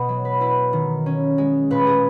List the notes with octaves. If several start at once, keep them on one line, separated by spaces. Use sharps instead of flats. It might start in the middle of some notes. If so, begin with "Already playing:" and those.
Already playing: B2 B3 D#5
F#3
B4
E4 B4
D#3
C#4
G#3
A#2 B4
G#4